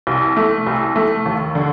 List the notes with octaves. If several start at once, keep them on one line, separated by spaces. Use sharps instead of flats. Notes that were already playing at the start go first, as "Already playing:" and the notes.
C2
A3
C2
A3
D#2
D3